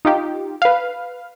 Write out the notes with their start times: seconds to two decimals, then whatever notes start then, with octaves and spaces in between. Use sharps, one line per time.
0.05 D#4 F4 G4
0.62 B4 F5